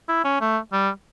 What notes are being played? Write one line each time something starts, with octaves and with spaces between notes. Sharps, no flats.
E4
C#4
A3
G3